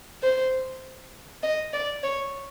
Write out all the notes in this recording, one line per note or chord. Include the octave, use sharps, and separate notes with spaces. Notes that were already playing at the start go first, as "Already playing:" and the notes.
C5
D#5
D5
C#5